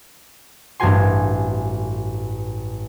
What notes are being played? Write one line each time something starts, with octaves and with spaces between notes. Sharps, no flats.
A1 G2 C4 F#4 G#5 C6